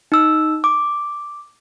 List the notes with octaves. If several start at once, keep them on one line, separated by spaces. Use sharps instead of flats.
D#4 E6
D6